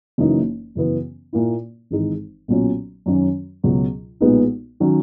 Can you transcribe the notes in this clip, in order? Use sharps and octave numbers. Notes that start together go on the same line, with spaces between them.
F#1 F#2 E3 A#3 D#4
F#2 C#3 E3 B3
A#2 A#3 E4
G#1 G#2 E3 G#3 D#4
B1 A#2 F#3 C#4
F#2 D#3 F#3 C#4
C#2 B2 F#3
B1 A#2 G#3 B3 D#4
D#3 F#3 C#4